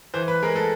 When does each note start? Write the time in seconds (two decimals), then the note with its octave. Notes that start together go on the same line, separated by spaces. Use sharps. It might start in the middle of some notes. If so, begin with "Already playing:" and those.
0.14 E3 C5
0.28 B4
0.43 G#3 A#4
0.56 A4